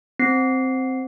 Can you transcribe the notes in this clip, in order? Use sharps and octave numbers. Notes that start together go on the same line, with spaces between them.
C4 C7